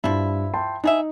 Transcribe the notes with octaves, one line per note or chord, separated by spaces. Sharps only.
G2 F3 E4
G5 A5 C6
B2 D#4 G#4 E5